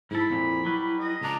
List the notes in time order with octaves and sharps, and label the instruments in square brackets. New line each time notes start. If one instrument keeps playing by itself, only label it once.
[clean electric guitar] G#2 A4 [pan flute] E4 [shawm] B5
[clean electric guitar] F2 A#2
F#3 G3 B4
[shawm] D#5
[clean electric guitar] C#2 D4 [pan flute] A#5